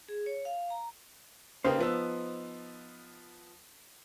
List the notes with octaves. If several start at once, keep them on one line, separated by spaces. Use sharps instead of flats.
G#4
C#5
F5
A#5
C#3 A#3 D#4 G4 B4 C5
F3 B3 E6